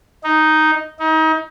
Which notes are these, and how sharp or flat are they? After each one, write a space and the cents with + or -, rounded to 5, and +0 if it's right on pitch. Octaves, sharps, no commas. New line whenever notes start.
D#4 +0
D#4 +30